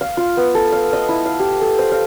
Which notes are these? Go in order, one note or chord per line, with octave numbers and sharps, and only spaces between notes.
F5
F4
B3
A4
F5
D#5
E4
F5
G4
A4
C5
F5